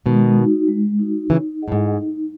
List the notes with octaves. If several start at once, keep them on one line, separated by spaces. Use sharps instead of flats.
B2 D#3 G#3
D#4 F#4
G#3
D#4 F#4
C#3 E3 D#4
G#4 D#5 F#5
A2
G#2
D#4